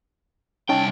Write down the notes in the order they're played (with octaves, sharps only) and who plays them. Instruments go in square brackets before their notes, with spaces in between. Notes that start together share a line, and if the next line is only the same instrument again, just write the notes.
[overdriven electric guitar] C2 G5 [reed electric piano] C#4 D#4 A5